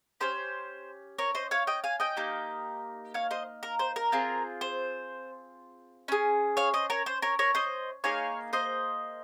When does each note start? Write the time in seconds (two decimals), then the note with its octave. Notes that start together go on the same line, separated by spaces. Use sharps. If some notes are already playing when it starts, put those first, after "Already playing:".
0.21 C#4 G4 C5
1.19 A#4 C#5
1.35 C5 D#5
1.51 C#5 F5
1.67 D#5 G5
1.84 F5 G#5
2.00 D#5 G5
2.17 A#3 D#4 G4
3.14 C#5 F5
3.31 C5 D#5
3.63 A#4
3.79 C5
3.96 A#4
4.12 C4 F4 G#4
4.61 C5
6.08 C#4 G#4
6.57 C#5 F5
6.74 C5 D#5
6.90 A#4 C#5
7.06 C5
7.22 A#4 C#5
7.39 A#4 C#5
7.55 C5 D#5
8.04 A#3 D#4 G#4 C#5 F5
8.53 C5 D#5